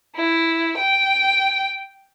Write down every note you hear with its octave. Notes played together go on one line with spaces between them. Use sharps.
E4
G5